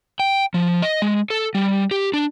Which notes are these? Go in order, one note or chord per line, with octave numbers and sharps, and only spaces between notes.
G5
F3
D#5
G#3
A4
G3
G4
D4